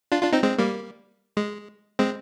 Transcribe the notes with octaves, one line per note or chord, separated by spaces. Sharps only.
D4 F4
D4 F4
C4 D#4
G#3 C4
G3 A#3
G#3
G#3 C4